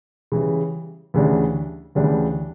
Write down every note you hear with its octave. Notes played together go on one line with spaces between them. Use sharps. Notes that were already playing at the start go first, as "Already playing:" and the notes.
C#3 E3 G3
D2 C#3 E3 G3 D4
D2 C#3 E3 G3 D4